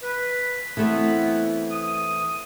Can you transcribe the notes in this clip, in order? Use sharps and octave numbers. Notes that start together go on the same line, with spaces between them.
B4
E3 A3 B3 C4
D#6